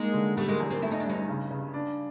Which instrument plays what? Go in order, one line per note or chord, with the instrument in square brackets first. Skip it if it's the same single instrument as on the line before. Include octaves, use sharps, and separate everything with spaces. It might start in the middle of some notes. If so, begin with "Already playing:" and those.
Already playing: [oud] G#3 A#3 [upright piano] D#4
[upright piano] D3
[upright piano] G3 [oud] A3 B3
[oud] G#3 A#3
[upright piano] E2
[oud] A#3 C4
[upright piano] A3 [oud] E4
[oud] D#4
D4
[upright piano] G2 [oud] C#4 D#4
[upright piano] C#3
C#3
D4